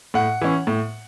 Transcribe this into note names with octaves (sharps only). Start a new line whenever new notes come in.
A2 F#5
E3 C#4
A2